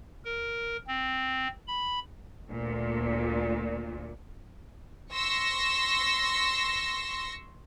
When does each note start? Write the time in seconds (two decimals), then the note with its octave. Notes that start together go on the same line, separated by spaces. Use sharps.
0.25 A#4
0.88 C4
1.67 B5
2.49 D2 A#2
5.13 C6 C#6 E6 A#6 C#7